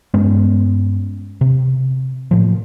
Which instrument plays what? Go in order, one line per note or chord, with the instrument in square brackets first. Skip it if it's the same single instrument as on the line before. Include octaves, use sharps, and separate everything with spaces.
[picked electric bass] G2 G#3 B3 C#4
C3
A2 F3